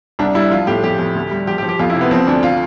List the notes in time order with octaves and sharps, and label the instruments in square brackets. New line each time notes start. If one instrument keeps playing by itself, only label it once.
[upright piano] C2 D4
G3 E4
F3 F4
A2 G4
F2 G4
F2
D2
G3
F3 G4
G4
F3
G4
F2 F4
E4
C3
B3
F3 C4
D2 D4
F4